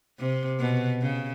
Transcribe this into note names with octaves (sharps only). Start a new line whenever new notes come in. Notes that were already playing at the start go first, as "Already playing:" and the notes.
C3
B2
C#3